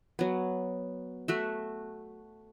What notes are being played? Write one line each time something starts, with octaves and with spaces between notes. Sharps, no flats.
F#3 B3
A3 F#4 E5